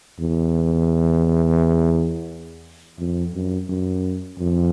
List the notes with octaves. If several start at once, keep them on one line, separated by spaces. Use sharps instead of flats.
E2
F2
F#2
F#2
F2